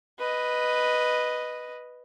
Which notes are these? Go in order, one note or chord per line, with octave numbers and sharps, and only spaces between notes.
B4 D#5